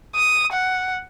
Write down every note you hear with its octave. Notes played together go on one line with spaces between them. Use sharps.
D#6
F#5